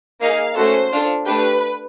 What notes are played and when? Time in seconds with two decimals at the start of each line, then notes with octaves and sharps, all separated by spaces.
0.21 A#3 D#4 G#4 F5
0.56 A3 C#4 F#4 A4 C5
0.92 D4 F4 A4
1.26 A3 D4 G4 B4